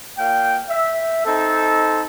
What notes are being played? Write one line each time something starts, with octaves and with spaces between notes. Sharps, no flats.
A#2 F5 G5
E5
C4 D#4 A4